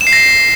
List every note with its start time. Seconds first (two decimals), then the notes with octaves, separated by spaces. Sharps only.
0.01 E7
0.07 C7
0.13 A#6